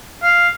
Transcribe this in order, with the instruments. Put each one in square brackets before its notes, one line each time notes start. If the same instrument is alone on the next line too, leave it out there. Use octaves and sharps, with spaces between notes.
[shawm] F5